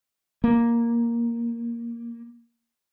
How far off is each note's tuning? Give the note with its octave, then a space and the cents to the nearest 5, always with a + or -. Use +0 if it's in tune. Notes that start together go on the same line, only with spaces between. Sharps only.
A#3 +5